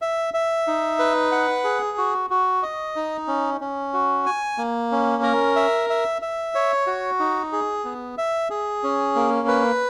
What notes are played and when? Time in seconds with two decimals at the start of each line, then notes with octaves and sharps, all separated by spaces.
0.02 E5
0.34 E5
0.67 D#4
0.99 B4
1.32 F#5
1.64 G#4
1.98 F#4
2.30 F#4
2.63 D#5
2.96 D#4
3.28 C#4
3.61 C#4
3.94 F#4
4.26 G#5
4.58 A#3
4.92 C#4
5.23 A#4
5.56 E5
5.90 E5
6.22 E5
6.55 C#5
6.87 F#4
7.19 D#4
7.53 G#4
7.85 B3
8.18 E5
8.50 G#4
8.83 C#4
9.15 A#3
9.48 B4